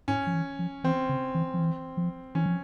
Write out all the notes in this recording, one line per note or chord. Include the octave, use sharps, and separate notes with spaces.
G#2 C#4
F3
E3
F3
E3 C4
C#3
E3
F3
E3
F3
E3 C#4
F3